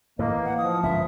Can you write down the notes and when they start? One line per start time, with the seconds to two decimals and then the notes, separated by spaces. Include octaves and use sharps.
0.19 A2 D3 F3 A#3 D#5
0.31 E3
0.44 F#5
0.58 F3 D#6
0.83 G1 C#2 F#2 E5